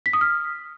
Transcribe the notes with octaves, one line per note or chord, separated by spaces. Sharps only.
B6
D#6
F6